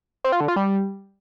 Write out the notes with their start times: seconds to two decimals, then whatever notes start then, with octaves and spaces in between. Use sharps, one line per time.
0.24 C4
0.32 F4
0.40 D3
0.48 F4
0.56 G3